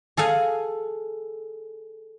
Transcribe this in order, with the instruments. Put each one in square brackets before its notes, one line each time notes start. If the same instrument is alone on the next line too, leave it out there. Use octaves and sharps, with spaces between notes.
[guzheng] G#4 A4 F5 G#5